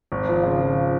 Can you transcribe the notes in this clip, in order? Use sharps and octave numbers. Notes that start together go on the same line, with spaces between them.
G#1
F3
C#3
F3